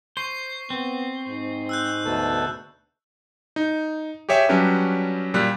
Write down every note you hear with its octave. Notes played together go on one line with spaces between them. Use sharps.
C5 C#6 C7
B3 C4
G#2
E6 F#6 G6
D2 B2 A4
D#4
G4 G#4 C#5 E5 G5
F#3 G3 C#4 D4 G4 B4
A#2 G3 F#6 B6